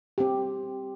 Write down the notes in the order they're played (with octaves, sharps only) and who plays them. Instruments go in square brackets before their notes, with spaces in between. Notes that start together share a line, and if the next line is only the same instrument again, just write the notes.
[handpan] C4 G4